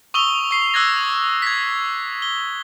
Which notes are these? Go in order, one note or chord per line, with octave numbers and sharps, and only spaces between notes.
C#6 D#6 E6 F7 G7
C#6 C7
D6 E6 F#6 G#6 A#6
G#6 B6
G7